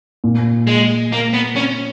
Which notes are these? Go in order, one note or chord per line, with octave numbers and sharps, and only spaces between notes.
A#2
G#3
A#3
B3
C#4